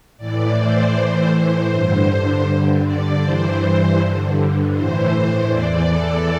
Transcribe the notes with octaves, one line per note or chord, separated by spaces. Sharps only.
A2 E3 D5
C5
A2 E3
C5
G2 D3
G2 D3
D5
G2 E3 C5
G2 D3
A2 E3 C5
E2 E3 D5
A4